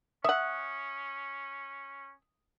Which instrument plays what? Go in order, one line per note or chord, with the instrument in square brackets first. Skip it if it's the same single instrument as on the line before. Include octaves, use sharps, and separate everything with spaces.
[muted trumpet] C#4 [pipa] E5 F#5 [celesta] D#6